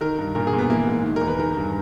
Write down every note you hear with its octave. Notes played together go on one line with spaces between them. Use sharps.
D#3 A#4
G2
A#2 A#4
G#4
A#2
B3
E3 A#3
G#2
D#3
E2 A#4
B4
D#3 A#4
G2